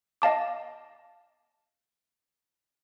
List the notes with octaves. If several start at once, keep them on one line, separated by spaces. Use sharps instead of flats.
D#5 F5 A5 D6